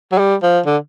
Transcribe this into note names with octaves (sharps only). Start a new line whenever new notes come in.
F#3
G3
F3
D3